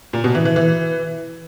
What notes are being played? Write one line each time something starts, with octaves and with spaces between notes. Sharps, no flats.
A#2
B2
E3
E3
E3